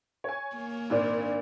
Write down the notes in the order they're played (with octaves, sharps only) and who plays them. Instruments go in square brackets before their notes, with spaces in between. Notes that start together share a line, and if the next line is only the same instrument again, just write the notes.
[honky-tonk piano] C#5 G#5
[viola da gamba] A#3
[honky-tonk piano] G#1 A#2 D4